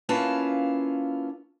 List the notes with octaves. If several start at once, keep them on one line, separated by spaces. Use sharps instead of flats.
A#3 C#4 E4 F4 B4 A5